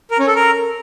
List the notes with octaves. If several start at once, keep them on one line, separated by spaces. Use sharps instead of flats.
A#4
C#4
A4
A#4